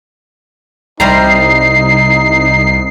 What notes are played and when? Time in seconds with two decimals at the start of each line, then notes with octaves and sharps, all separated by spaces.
1.00 C2 C3 G3 D#4 A#5 C7